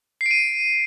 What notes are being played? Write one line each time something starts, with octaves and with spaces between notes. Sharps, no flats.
C7
D7
D#7